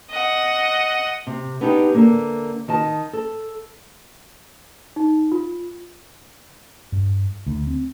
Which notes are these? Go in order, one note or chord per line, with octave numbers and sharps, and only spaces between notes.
D#5 F#5
C3
B3 D4 D#4 G4
D3 A#3 E5
D#3 D#5 A5
A4
D#4
F4
G2
D2
C4